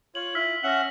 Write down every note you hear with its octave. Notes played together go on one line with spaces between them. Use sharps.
F4 C#5 F#7
E4 F4 E6 F6 B6
C#4 E5 F#5 A#6 F#7